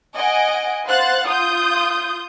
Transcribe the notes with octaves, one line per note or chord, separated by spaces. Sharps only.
D#5 F#5 G#5 D7
C5 F5 F#5 F#6 A6
F4 D#6 G6